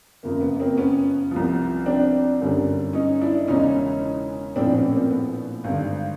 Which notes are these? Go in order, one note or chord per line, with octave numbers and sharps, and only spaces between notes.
F#1 F2 C#3 A#3
B3
A#3 C4
B3 C#4
C2 C3 F3
C4 D4
G1 F#2 D3 G3
C#4 D#4
D4 E4
E1 E2 C#3 C#4 D#4
A#1 A2 F3 C4 D4
B3 C#4
A#3 C4
B3
G#1 G2 D3